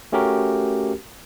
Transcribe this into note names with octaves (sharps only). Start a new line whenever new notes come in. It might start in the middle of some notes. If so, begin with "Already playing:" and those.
A3 C#4 F#4 G4 A#4